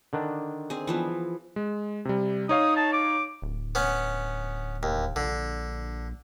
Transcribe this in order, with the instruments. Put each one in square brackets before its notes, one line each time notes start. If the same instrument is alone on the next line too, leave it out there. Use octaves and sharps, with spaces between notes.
[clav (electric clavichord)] D3 D#3 D4
[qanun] C4 G#4
E3 F3 B3
[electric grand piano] G#3
C3 G3
[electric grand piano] D#4 C#5 F5 [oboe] D#6
[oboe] A5
D6
[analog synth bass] D1
[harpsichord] B3 C#4
D#2
[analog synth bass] A#1 [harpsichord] D3